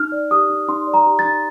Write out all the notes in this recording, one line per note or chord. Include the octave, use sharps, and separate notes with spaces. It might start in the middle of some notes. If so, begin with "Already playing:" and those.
Already playing: D#4 F6
D5
G4 D#6
D#4
D#4 C6
D5
A#5
G4
A6
D#4